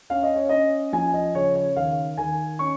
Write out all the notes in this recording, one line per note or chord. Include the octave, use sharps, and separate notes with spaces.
C#4 F5
D#5
C#5
C#4 D#5
F3 G#5
D#5
C#3 C#5
C#5
D#3 F5
D#3 G#5
C#4 C#6